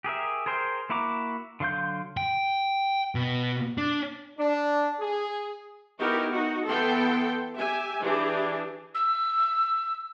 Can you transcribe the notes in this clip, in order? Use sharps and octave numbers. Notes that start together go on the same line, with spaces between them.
G4 G#4 A#4 E5
G#4 A#4 C5 G5
A#3 E4 F#4 A#5 D6
D3 F#3 F5 C6 G6
G5
B2
D4
D4
G#4
B3 D#4 E4 F#4 G4 A#4
D#4 F#4
E3 B3 A4 G5 C6
G4 E5 G#5
E3 D4 G4 G#4
E6